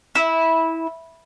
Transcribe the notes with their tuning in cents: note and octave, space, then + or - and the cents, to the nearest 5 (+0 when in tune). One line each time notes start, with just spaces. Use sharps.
E4 -15